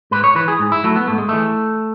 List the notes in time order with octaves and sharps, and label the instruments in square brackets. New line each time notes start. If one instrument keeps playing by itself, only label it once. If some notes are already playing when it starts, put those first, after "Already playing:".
[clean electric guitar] G#2 B4
C#5
E3 B4
G#4
G#2
E4
F#3 A3
B3
G#2 A3
G#3
E3 A3